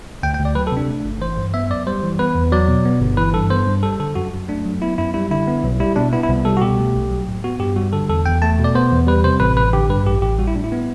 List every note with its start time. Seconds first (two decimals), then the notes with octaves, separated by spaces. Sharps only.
0.23 D2 G5
0.34 G5
0.39 D2
0.45 D5
0.55 F#3 B4
0.67 A4
0.72 C3
0.77 D4
0.89 A3
1.05 G1
1.21 E3 C5
1.37 G2
1.54 B3 E5
1.70 F#2 D5
1.87 G3 C5
2.03 E3
2.19 B3 B4
2.35 E2
2.52 F#3 D5
2.68 B2
2.86 B3
3.01 G1
3.17 E3 B4
3.34 G2 A4
3.50 B3 C5
3.67 G2
3.83 G3 A4
4.00 D3 A4
4.15 F#2 F#4
4.33 F#2
4.48 A3 D4
4.65 F#3
4.82 B3 E4
4.98 F#2 E4
5.14 G3 E4
5.31 D3 E4
5.47 B3
5.64 B1
5.80 G3 E4
5.96 B2 D4
6.13 B3 E4
6.23 E4
6.29 C2
6.45 G3 A4
6.57 F#4
6.61 B2 G4
6.78 A3
6.95 B1
7.11 F#3
7.27 A2
7.44 B3 F#4
7.60 G2 G4
7.76 G3 F#4
7.93 D3 A4
8.09 E2 A4
8.26 E2 G5
8.42 A3 A5
8.59 B2
8.64 D5
8.75 B3 C5
8.91 E2
9.07 G3 B4
9.24 C3 C5
9.40 A1 B4
9.57 A1 B4
9.73 D3 G4
9.89 G2 B4
10.05 A1 G4
10.22 A1 G4
10.39 G3 F#4
10.47 E4
10.55 A2 D4
10.64 E4
10.72 B3